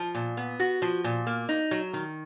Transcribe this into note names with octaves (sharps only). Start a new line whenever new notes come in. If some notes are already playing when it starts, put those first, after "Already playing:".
Already playing: F3
A#2
B3
F#4
F3
A#2
A#3
D#4
F#3
D#3